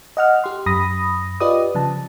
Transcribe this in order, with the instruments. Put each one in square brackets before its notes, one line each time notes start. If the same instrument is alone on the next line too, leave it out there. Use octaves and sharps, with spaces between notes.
[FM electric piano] D#5 F#5 F6
G4 C6
F#2 B5 D#6 A#6
F4 G4 B4 D5 D#5 D#6
C#3 F3 A5